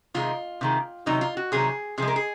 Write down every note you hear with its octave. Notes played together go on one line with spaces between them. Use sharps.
C3 D#3 G#3 F4
C3 D#3 G#3
C3 D#3 F#3 D#4
F4
F#4
C3 D#3 F#3 G#4
C3 F3 G#3 G#4
A#4
G#4